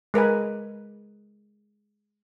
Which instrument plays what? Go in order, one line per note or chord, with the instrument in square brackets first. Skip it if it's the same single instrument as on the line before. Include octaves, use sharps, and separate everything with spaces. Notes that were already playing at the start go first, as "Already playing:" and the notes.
[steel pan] G#3 A#4 B4 G#5